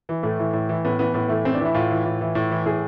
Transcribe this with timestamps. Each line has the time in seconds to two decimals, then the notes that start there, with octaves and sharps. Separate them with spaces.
0.09 E3
0.23 A2 A3
0.39 E3
0.53 A2
0.69 E3
0.84 A2 B3
0.99 E3 B3
1.14 A2 B3
1.29 E3 A3
1.45 A2 C4
1.54 D4
1.60 E3
1.65 E4
1.74 A2 F4
1.91 E3
2.06 A2
2.21 E3
2.35 A2
2.51 E3
2.66 A2 G#4